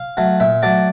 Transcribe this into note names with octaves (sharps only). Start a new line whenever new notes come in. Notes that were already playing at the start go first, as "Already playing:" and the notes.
Already playing: F5
F#3 A3
A#2 E5
F#3 A3 D5